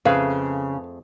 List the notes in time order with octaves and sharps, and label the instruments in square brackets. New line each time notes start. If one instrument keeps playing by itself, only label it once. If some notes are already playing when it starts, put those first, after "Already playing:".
[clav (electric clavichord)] F2 A3 G#4 [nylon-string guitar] C#3 [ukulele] B4 F5